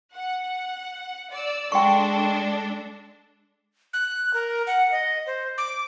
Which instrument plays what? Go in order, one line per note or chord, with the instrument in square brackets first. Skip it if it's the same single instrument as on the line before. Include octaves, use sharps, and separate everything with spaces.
[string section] F#5
D5 E6
[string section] G#3 D4 A4 [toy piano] G5 C6 C#6
[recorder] F#6
A#4
F#5
D#5
C5
D6